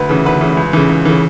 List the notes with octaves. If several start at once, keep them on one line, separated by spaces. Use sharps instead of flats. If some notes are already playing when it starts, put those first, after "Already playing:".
Already playing: D2 B4
C#3 E3
D2 B4
C#3 E3
C#2
C#3 E3
C#2
C#3 E3